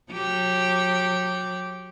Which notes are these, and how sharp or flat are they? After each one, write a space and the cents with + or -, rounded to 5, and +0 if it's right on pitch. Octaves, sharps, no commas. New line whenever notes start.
F#3 -30 G4 -5